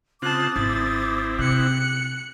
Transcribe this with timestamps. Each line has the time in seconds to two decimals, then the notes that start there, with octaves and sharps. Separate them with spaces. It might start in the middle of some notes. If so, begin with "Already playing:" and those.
0.22 C#3 C4 F4 A5 D6 D#6 F#6
0.56 G#1 C4 E4 A6
1.39 C3 F#6 C#7